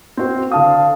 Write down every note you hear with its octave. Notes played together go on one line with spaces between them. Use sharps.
C4 F#4 C5
D3 F5 A5 D#6